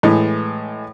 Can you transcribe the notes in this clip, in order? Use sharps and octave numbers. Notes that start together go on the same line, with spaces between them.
A2 E3 G#3